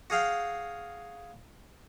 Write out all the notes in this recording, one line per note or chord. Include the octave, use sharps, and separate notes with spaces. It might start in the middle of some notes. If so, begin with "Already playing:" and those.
F#4 G#4 F5 G5